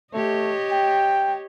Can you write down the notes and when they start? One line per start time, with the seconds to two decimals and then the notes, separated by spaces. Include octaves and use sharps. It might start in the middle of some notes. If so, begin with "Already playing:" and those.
0.14 A3 G4 C#5 D#5
0.71 G5